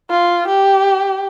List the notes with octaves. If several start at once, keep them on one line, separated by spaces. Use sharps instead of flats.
F4
G4